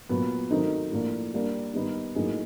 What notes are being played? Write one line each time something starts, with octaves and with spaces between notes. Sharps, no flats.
A#2 F#3 B3
D#3 F#3 A3 C4 D#4
A2 F3 A#3 D4
G3 A#3 D4
D#3 G3 B3 D#4
A2 F#3 A#3 D#4 G#4